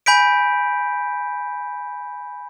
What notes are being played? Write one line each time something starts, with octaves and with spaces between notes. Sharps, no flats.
G#5 B5 G6 B6 D7